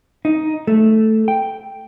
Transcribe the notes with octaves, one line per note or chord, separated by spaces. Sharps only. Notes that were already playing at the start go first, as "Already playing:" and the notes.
D#4
A3
G5